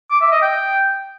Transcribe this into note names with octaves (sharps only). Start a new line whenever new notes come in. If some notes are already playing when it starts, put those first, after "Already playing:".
D6
E5
D#5
G5